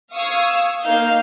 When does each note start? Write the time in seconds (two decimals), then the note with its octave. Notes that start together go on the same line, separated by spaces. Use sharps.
0.13 F5 C#6 D#6 E6 G#6
0.84 A#3 D#4 F5 G6